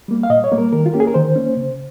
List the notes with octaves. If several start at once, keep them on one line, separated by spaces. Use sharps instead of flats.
G3 A#3
F5
A#2 D#5
C#5
G3 A#3
A#4
D#3 A#4
F4
A#3 C#4 G4
G#4
A#4
D#3 C5
A#3 C#4
C#3